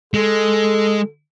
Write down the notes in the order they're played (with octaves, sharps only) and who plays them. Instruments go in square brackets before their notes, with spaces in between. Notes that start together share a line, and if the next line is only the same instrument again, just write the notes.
[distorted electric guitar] G#3 [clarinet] A4